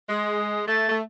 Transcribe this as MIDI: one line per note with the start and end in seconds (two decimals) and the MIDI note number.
0.09 0.67 56
0.09 0.65 87
0.67 0.89 57
0.67 0.95 93
0.89 1.01 57